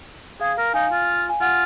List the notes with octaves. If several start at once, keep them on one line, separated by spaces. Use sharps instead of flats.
G#4 F5
A#4
D#4 F5 G#5
F4
G#5
F4 F#5